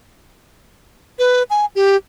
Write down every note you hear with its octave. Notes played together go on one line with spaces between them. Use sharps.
B4
G#5
G4